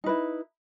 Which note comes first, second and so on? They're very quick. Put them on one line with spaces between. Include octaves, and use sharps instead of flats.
D#4 B4 E4